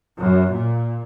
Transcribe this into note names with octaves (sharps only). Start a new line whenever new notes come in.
F#2
A#2